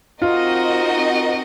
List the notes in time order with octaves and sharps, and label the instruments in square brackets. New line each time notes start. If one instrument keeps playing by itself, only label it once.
[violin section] C4 D#4 F#4 A#4 D#5 [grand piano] F4